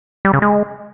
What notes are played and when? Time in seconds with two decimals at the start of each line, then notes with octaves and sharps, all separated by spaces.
0.25 G3
0.33 C#3
0.42 G#3